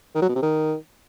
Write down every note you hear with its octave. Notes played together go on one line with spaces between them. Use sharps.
D#3
F#3
B2
C3
D#3